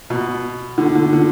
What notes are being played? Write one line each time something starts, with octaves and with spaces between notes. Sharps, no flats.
B2
D3
D3
D3